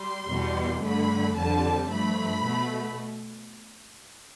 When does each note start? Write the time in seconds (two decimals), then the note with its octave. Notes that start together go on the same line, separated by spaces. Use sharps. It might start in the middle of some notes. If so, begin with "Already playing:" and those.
Already playing: G3 C6
0.27 E2 B2 G3
0.81 G2 D3 A3 B5
1.36 F2 D3 G3 A5
1.89 G2 F3 A3 B5
2.44 B2 A3